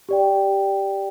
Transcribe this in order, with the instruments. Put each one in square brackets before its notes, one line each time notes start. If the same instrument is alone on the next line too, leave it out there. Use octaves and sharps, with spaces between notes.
[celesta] G4 D5 G5